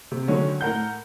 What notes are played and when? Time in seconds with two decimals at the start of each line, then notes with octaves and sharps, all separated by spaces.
0.11 C3
0.28 D3 D#3 F#3 G#3 C#4
0.61 A2 A#4 F#5 G6